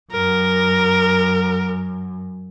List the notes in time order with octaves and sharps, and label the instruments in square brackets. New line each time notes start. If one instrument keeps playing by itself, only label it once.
[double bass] F#2 [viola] A#4